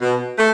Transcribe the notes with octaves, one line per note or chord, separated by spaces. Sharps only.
B2
A3